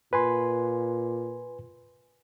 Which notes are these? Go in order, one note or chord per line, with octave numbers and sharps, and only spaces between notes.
A#2 B4 G#5 C6